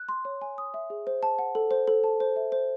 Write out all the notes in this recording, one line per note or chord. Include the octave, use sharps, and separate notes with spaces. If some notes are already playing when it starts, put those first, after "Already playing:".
Already playing: F#6
C6
C#5
G#5
D#6
E5
G#4
C5
A5
F#5
A4
C5
A4
A5
C5
E5
C5